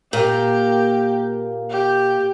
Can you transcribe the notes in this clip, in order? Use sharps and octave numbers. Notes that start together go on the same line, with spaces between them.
A#2 A#3 G4
G4